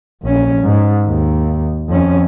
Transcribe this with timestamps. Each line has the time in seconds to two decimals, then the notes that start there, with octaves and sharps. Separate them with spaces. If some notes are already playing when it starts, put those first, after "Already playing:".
0.23 A#1 C#4
0.61 G#2
1.06 D#2
1.89 F2 C#4